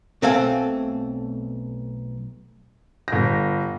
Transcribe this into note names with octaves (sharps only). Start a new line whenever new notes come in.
B1 A3 C4 A4 F5 G#5
G1 A#6